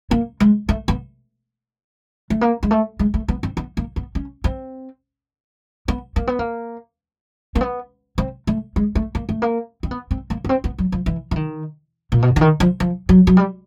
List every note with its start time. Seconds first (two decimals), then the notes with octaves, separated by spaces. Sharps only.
0.11 A#3
0.40 G#3
0.69 A3
0.88 B3
2.30 A3
2.41 A#3
2.63 G#3
2.71 A3
2.99 G#3
3.14 A3
3.28 B3
3.43 C4
3.57 B3
3.77 A#3
3.96 B3
4.15 C#4
4.44 C4
5.88 B3
6.16 A#3
6.27 B3
6.39 A#3
7.55 A#3
7.61 B3
8.18 C4
8.47 A3
8.76 G#3
8.95 A3
9.15 A#3
9.29 A3
9.42 A#3
9.83 C4
9.91 B3
10.11 C4
10.30 A#3
10.45 B3
10.49 C4
10.64 B3
10.78 F#3
10.92 F3
11.06 E3
11.31 E3
11.36 D#3
12.12 A#2
12.22 B2
12.36 D3
12.41 D#3
12.60 F3
12.80 F3
13.09 F#3
13.27 F#3
13.37 G3